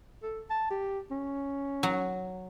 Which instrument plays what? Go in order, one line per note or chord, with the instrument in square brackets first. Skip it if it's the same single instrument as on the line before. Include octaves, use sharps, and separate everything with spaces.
[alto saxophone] A4
A5
G4
C#4
[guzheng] F#3